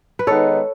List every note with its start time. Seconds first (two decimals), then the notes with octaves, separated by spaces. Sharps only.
0.19 B4
0.27 D#3 G#3 B3 D#4 A4 C#5